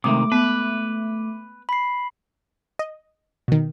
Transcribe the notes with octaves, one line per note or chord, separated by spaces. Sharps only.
C3 D#3 G#3 A3 D6 D#6
B3 B4
B5 C7
D#5
B2 D#3